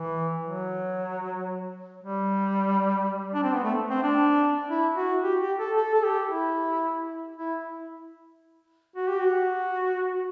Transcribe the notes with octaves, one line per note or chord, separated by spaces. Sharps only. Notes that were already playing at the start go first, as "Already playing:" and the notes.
Already playing: E3
F#3
G3
D4
C4
B3
A3
C4
D4
E4
F#4
G4
G4
A4
A4
A4
G4
E4
E4
F#4
G4
F#4